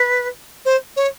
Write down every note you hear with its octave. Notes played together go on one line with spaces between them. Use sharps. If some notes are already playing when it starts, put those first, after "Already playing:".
Already playing: B4
C5
C#5